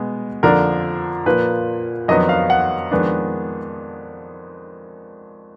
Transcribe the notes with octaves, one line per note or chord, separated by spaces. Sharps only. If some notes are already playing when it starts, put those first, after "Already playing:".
Already playing: B2 G#3 B3
F2 D3 F3 A#3 D4 A#4
A#2 F3 A#3 B4
F2 D#3 F#3 B3 D4 D#5
F5
F#5
F2 D#3 G#3 B3 D4